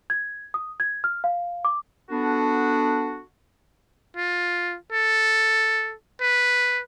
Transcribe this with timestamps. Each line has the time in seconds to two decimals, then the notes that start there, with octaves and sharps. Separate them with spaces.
0.10 G#6
0.54 D#6
0.80 G#6
1.04 F6
1.24 F5
1.65 D6
2.10 B3 D4 F#4 A4
4.17 F4
4.92 A4
6.21 B4